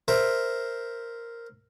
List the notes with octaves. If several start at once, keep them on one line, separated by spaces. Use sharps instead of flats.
A#4 C5 E5